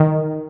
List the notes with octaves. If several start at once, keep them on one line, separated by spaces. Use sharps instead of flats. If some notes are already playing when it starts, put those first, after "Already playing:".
Already playing: D#3